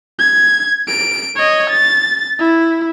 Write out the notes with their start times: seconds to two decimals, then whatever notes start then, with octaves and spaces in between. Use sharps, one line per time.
0.19 G#6
0.88 D7
1.36 C#5 D#5
1.70 A6
2.39 E4